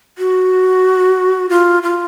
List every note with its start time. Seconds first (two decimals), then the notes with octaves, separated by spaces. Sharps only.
0.18 F#4
1.50 F4
1.83 F4